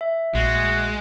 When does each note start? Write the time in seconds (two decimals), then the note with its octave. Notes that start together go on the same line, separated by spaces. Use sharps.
0.01 E5
0.35 A#1 G#3 F#4